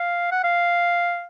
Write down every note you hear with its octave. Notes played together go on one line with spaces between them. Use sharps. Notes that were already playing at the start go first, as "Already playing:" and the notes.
Already playing: F5
F#5
F5